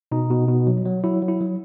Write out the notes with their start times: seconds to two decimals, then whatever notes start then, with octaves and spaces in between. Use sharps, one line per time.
0.12 B2 D#4
0.30 B2
0.48 B2
0.67 F#3
0.85 F#3
1.04 F#3 E4
1.22 F#3
1.28 E4
1.41 F#3